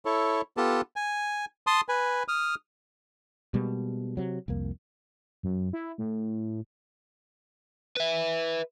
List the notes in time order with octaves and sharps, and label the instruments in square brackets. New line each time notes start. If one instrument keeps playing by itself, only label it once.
[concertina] E4 A4 C#5
B3 F4 G4 A4 A5
G#5
A5 C6 D#6
B4 G#5
D#6 F6
[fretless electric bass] B2 G3 G#3 A#3
C3 F#3
C2 F2 A#3
[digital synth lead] F#2
E4
A2
[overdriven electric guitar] B4 E5